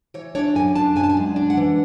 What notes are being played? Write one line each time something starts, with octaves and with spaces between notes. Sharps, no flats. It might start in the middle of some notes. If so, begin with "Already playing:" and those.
E3 C#5
D4 C#5
F#2 G#5
D4 A5
F#2 G#5
A5
G#5
G#3
D4
F#5
E3